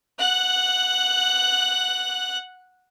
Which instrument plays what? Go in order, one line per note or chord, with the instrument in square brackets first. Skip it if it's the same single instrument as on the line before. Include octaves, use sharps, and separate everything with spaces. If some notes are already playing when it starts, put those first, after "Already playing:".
[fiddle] F#5 F#6